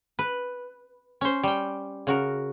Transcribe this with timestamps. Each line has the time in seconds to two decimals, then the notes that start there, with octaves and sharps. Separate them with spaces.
0.19 B4
1.21 C#4 C5
1.43 G3 G5
2.07 C#3 F#4 A#4